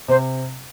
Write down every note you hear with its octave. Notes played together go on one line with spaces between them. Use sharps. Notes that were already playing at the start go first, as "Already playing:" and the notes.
C3 C5